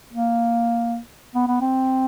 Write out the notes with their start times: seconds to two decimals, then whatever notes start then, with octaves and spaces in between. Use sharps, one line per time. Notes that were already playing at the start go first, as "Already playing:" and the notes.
0.13 A#3
1.35 B3
1.48 B3
1.61 C4